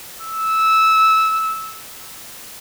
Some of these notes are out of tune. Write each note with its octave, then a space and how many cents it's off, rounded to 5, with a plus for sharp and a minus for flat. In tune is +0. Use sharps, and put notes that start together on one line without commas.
E6 -15